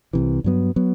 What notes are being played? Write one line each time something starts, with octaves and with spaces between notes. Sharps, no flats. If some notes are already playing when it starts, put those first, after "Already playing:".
C2 C3 E3
G2 F#3 B3
F#3 B3